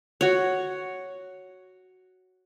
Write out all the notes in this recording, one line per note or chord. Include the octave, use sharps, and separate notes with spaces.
F#4 C#5